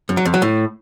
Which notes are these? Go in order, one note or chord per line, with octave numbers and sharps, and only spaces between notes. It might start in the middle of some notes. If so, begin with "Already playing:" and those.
F#2
F#3
F2
F#3
A2